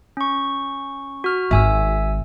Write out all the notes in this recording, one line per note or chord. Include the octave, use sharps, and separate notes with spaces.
C#4 C#6
F#4 F6
G#1 G#2 E5 G#5 E6